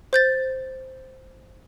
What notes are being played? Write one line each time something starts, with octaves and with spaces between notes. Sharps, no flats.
C5 G6 A6